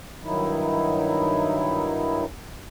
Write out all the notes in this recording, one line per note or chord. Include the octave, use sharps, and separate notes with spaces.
G2 D#3 F#3 D#4 E4